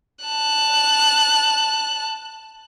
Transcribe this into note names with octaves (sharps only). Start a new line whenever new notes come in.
A5 F#6